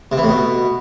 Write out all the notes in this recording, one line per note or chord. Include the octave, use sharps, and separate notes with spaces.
C3
E3
A2
B2